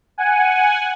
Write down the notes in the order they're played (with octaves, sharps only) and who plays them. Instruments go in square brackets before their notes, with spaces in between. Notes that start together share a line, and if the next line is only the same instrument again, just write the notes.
[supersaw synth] F#5 G#5